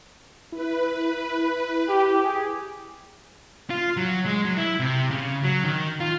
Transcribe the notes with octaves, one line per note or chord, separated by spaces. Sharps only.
E4 B4
G4
G4 G#4
F4
F#3
G#3
F#3
E4
C3
C#3
F#3
D#3
F4